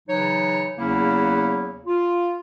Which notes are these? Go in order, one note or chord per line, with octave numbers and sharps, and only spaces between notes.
C#3 E3 F#3 D#4 C#5
E2 C#3 F#3 A#3 C#4 E4
F4